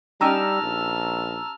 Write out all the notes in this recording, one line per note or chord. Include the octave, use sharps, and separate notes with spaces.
G3 C#4 D#4 G4 A5 A#5 E6 F6
A#1